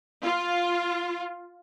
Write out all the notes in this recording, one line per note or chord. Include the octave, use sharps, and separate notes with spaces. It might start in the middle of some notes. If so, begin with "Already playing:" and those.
F4